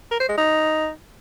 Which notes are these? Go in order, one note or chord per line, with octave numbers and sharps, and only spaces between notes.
A#4
C5
G#3
D#4